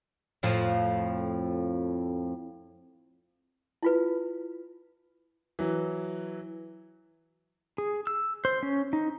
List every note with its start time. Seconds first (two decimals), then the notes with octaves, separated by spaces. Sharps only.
0.43 F2 A2 F3
3.83 E4 F4 B4
5.59 E3 F#3
7.78 G#4
8.07 E6
8.45 C5
8.63 C#4
8.93 D#4